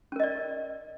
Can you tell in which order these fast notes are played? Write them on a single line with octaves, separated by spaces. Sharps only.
C#4 A#4 D#5 D5